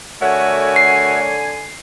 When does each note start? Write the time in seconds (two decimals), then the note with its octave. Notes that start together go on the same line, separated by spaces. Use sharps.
0.21 D3 A3 F#4 A#4 C#5 E5 F#5 G#5
0.76 C7